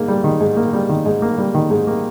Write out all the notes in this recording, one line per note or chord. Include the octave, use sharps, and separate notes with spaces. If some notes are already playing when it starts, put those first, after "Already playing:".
Already playing: G#2 A#3
G3
D#3
G#2
A#3
G3
D#3
G#2
A#3
G3
D#3
G#2
A#3